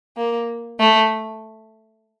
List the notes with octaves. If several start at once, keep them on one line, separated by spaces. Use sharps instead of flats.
A#3
A3